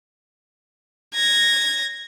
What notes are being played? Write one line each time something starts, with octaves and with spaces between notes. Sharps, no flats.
G#6 A#6